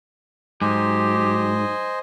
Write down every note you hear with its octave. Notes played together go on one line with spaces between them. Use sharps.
G#2 F#3 G4 C5 D#5 G#5